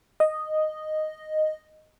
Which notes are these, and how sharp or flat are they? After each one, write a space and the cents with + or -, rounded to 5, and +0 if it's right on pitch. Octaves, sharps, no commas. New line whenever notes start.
D#5 -5